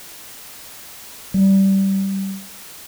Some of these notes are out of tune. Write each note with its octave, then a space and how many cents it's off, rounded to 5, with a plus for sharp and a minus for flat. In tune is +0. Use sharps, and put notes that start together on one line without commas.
G3 -15